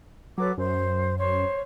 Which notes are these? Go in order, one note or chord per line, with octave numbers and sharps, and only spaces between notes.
F#3 A4 B4 D6
F#2 C5
C5 C#5